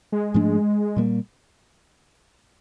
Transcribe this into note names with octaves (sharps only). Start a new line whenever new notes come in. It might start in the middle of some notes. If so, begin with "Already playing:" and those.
G#3
G#2 F3 A3 D4
A#2 G3 A#3